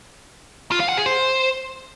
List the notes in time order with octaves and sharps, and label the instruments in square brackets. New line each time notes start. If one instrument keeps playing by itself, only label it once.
[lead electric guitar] F4
F5
F#5
G#4
C5